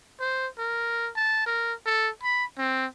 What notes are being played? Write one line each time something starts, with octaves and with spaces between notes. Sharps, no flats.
C5
A#4
A5
A#4
A4
B5
C4